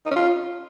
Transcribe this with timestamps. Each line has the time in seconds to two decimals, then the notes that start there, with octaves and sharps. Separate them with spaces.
0.06 D#4
0.11 C#4
0.16 F4